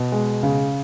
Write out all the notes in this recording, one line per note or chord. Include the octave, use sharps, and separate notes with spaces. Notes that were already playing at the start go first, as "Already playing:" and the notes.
Already playing: B2
G#3
C#3